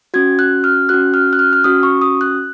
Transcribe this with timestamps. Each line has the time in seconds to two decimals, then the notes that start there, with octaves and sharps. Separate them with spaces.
0.14 C#4 F#4 G#6
0.39 F#6
0.64 F6
0.89 C#4 F#4 F#6
1.14 F6
1.33 F#6
1.39 F6
1.53 F6
1.64 C#4 F#4 D#6
1.83 C#6
2.02 D#6
2.21 F#6